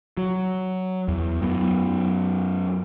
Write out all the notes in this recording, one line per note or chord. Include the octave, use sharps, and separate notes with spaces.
F#3
E2
F#2 F#3 B3